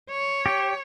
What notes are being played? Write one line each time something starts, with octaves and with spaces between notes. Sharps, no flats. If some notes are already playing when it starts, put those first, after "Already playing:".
C#5
G4